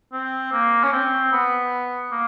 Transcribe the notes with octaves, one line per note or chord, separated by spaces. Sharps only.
C4
A#3
C#4
C4
B3
A#3